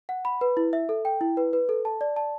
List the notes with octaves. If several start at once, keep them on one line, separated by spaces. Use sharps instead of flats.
F#5
B5
B4
E4
E5
A4
G5
E4
B4
B4
A4
A5
D5
A5